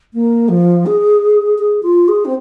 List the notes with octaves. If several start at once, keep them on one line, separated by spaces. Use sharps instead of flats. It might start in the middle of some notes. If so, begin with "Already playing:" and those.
A#3
F3
G#4
G#4
F4
G#4
C4